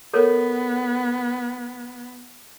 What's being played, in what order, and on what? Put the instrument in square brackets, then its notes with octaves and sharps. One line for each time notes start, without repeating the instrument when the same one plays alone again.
[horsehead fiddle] B3 [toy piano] A4 A#4 C#5